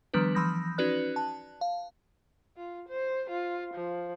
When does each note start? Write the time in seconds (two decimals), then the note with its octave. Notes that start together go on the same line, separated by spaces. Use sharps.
0.14 D#3 F3 G3 B3 D4 B4
0.35 E3 F3 B5 D#6 G6 A#6
0.78 C#4 D#4 F#4 B4 D5 F#6
1.16 A5
1.61 F5
2.57 F4
2.89 C5
3.30 F4
3.75 F3